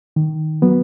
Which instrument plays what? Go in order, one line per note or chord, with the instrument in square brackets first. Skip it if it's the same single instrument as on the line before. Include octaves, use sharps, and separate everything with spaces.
[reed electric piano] D#3
F#3 B3